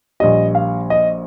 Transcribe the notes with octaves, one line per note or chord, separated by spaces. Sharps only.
A#1 A#2 G3 D#5
F5
D#5